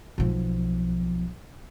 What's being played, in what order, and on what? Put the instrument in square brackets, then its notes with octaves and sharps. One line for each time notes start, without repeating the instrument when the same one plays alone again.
[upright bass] B1 F3